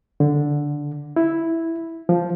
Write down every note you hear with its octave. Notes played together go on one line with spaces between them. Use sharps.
D3
E4
F3